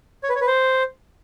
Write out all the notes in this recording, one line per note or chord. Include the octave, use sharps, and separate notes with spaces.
C#5
B4
C#5
B4
C5